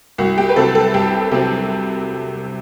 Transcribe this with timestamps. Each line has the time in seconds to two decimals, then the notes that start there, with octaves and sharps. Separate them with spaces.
0.18 C2 F#4
0.38 G4
0.49 B4
0.56 C3 F#3 C4 A4
0.75 A4
0.94 C2 G4
1.31 C3 F#3 C4 G4